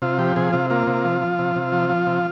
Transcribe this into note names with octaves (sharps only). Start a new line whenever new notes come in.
C3 F4
F3 G4
C3 G#4
C3 F4
A#3 F4
C3
F3
F3
C3
C3
F3
F3
C3